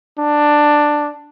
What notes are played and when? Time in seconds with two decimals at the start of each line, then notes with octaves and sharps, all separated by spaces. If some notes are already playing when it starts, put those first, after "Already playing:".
0.18 D4